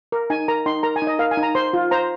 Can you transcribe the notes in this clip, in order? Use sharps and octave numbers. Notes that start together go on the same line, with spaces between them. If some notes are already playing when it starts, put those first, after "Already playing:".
A#4
D#4 G#5
A#4 A#5
D#4 C6
A#4 A#5
G#5
D#4
D#5
A#4 F5
G#5
D#4
A#5
C5 C6
F4
C5 A#5